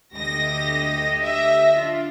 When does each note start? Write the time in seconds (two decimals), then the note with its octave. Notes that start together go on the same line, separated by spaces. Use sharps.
0.16 D2 G4 D#5 A#6
1.21 E5 A#6
1.76 D4 F4